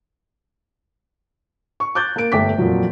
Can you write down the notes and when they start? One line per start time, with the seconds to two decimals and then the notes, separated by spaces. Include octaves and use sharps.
1.80 C#6
1.95 D6 F#6 G6 A6
2.16 A#3 D7
2.32 G1 A3 E5 G5 D6 B6
2.58 F2 A#2 F#3